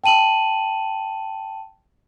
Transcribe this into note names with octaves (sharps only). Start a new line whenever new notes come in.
G5 A5 D#7 F#7